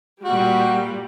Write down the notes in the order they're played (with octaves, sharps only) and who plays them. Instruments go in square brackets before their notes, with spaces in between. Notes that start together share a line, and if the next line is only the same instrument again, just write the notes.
[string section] A#2 G3 [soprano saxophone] F#4